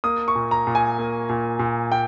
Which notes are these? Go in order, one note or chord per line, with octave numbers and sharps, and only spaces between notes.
A#3 D#6
C#6
A#2
A#5
A#2
G#5
A#3
A#2
A#2
A#3 G5